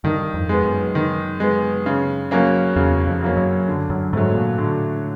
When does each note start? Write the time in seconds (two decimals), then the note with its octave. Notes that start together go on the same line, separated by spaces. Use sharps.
0.04 G2 D#3
0.34 F2
0.49 G#3 B3
0.65 F#2
0.95 D#3
1.40 G#3 B3
1.86 C#3
2.31 F#3 A#3 C#4
2.76 E2 C#3
3.07 F2
3.22 F#3 A#3 C#4
3.37 F#2
3.68 D3
3.90 F#2
4.13 G#2 F#3 A3
4.35 A#2
4.58 A2 D3